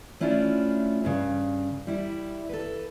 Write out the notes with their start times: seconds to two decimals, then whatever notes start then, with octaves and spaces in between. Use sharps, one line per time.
0.20 A3 C#4 D4 E4 F4 D5
1.05 G2 C#3
1.87 G3 E4
2.49 A4 B4